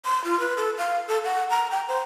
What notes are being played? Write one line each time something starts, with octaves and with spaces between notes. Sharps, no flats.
C6
F4
B4
A4
F5
A4
F#5
A#5
G5
C5